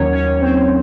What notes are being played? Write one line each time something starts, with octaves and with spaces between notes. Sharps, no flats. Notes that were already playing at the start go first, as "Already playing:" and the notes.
Already playing: D#2 D#3 F#3 C#4 C#5
C#4 C#5
C4 C5